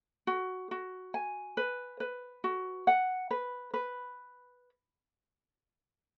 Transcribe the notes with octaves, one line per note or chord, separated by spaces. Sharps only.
F#4
F#4
G#5
B4
B4
F#4
F#5
B4
B4